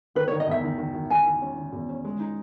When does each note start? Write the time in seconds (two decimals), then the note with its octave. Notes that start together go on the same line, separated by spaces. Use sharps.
0.15 D#3 B4
0.28 D#3 C#5
0.40 D#5
0.47 E2 E5
0.64 D#3
0.78 D#3
0.94 D#3
1.10 D#3 G#5
1.26 D#3
1.42 C#4
1.57 D#3
1.72 E2
1.89 C#4
2.05 G#3
2.20 D#4